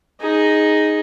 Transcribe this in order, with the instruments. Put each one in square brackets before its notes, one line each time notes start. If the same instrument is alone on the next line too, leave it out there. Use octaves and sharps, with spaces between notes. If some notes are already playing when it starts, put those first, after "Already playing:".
[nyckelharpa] D#4 G#4